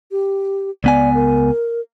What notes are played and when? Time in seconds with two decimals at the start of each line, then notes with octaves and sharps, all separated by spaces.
0.12 G4
0.84 C#2 B3 D5 G#5
1.15 A#4